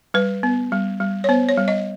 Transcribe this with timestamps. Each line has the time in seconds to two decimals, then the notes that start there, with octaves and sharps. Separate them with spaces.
0.14 G3 B4
0.43 B3
0.72 G3
1.00 G3
1.24 C#5
1.29 B3 C5
1.49 C#5
1.58 G3
1.68 D#5